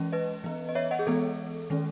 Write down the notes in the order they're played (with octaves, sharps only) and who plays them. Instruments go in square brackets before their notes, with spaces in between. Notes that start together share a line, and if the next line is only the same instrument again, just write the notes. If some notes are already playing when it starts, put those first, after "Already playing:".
Already playing: [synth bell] E3 G#3 C#4
B4 D#5
E3 B3
D#5
C#5 E5
D#5 F#5
G#4
E3 G#3 B3 A4
D#3 G#3 C#4